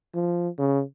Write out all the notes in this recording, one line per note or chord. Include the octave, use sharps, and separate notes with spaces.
F3
C#3